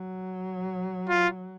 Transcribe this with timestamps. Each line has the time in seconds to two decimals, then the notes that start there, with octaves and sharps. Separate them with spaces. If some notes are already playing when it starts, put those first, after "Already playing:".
Already playing: F#3
1.10 F4